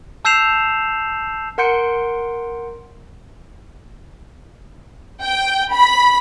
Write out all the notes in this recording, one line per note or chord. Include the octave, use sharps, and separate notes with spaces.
A5 E6 G6 C7 E7 F7
A#4 F#5 C6 G6 C#7 D7
G5
B5